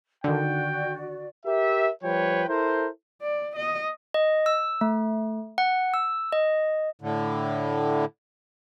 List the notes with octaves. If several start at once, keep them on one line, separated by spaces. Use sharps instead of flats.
D3 D#3 F#4 D5 G5
G4 A#4 E5
F3 G3 B4 C#5 G5
E4 A4 A#4 C5
D5
D#5
D#5
E6
A3
F#5
E6
D#5
A2 D3